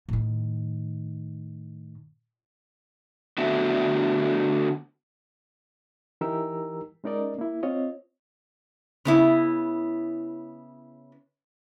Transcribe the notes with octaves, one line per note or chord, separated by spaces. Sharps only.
A2 D#3
D3 A3 B3 F#4 E5
E3 D#4 G4 A#4 A#5 E6
G#3 C#4 D#4 A#4 D5 D#5
A#3 E4
C4 F4 C#5 D#5
C#3 B3 E4